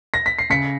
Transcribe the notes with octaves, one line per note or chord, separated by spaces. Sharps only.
A#6
B6
C7
C#3 B6 C#7